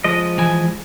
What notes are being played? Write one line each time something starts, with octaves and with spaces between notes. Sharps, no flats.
F3 G#3 D#5
E3 G#5